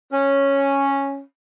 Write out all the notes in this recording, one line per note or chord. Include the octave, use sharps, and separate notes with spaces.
C#4